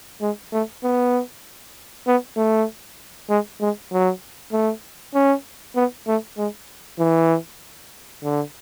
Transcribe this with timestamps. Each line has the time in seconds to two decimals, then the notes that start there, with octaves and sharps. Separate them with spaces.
0.21 G#3
0.52 A3
0.84 B3
2.07 B3
2.37 A3
3.29 G#3
3.61 G#3
3.92 F#3
4.52 A3
5.14 C#4
5.76 B3
6.07 A3
6.37 G#3
6.99 E3
8.23 D3